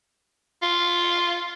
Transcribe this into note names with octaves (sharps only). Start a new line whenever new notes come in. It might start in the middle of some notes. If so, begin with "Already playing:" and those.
F4